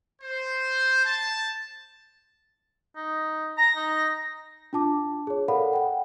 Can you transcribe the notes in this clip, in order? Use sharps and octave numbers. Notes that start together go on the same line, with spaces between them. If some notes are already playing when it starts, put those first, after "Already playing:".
C5
A5
D#4
A#5 A#6
D#4
D4 F4 A5 D6
G#4 C#5
A4 A#4 D5 F5 F#5 B5
F#5 G5